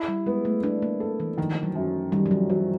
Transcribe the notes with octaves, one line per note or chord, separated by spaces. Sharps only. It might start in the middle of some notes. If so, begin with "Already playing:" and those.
Already playing: E4
G3
G#3 B3
A3
B3 D4
A#3
A4
E3
D#3 F3
F#3
F#2
D#3 G3
F#3
F3
E3 F#3